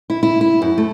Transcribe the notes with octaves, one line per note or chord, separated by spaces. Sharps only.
E4
E4
E4
F#2
A3